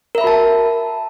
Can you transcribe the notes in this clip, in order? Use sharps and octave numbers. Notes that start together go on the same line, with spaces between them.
F#4 A#4 E5 A5 B5